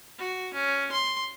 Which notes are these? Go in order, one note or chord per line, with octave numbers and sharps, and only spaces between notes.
F#4
C#4
C6